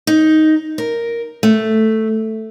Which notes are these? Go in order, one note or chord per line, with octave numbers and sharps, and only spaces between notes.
D#4
A#4
A3